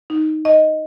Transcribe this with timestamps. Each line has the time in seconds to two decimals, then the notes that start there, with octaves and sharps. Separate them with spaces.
0.10 D#4
0.45 D#5